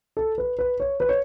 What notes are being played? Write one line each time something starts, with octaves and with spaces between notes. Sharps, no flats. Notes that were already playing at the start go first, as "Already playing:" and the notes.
A4
B4
B4
C#5
B4
C#5